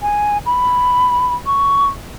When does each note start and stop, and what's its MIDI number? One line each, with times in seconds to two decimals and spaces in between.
0.02 0.38 80
0.46 1.34 83
1.46 1.89 85